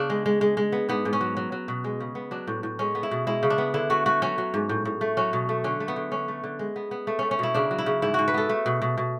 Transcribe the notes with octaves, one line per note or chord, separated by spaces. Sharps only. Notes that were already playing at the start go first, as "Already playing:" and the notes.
Already playing: C#3 B3 D4
G#3
G#3
G#3
G#3
B3
G#2 B3
G#2
C#4
F#3
F#3
F#3
B2
G#3
C#3
B3
F#3 D4
A2
A2
G#3 C#4
B3
E4
B2
G#3 E4
C#3
D4
B3
D3 E4
A3 F#4
A3 F#4
F#3 C#4
F#3
G#2
A2
A2
A3
F#3 C#4
B2
A3
D3 C#4
A3
B3
D3
D3 C#4
A3
D3
G#3
B3
B3
A3
A3 C#4
C#4
B2 E4
C#3 D4
F#3
E4
C#3
G#2 E4
G#2 F#4
B4
B3 A4
A3
B2
B2
B2